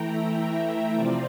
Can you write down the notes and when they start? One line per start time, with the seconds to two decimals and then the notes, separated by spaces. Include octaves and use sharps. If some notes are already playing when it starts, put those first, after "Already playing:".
Already playing: E3 A3 E4 G5 A#5
0.11 E5
0.95 C3 F3 C4 F4 D5